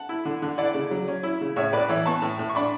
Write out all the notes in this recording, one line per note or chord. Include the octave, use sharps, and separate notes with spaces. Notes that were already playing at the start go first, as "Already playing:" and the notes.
Already playing: F#5 A5
E4
D3
D3
E4 D5 F#5
C#3
F#3
C#4
E4
C#3
A2 C#5 E5
A2 B4 D5
E3 C#5 E5
B3 A5 C#6
A2
A2
C#6
D4 B5 D6